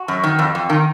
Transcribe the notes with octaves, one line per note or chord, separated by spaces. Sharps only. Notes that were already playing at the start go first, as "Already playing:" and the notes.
Already playing: F#4
F#2
D#3
F2
F2
D#3